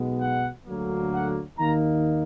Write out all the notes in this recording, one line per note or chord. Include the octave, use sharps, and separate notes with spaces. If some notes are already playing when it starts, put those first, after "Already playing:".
Already playing: B1 B2 G#3 B3
F#5
D2 D3 F#3 A#3
F#5
D#2 D#3 A#3 D#4 A#5